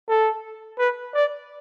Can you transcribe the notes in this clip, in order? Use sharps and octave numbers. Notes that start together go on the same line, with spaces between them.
A4
B4
D5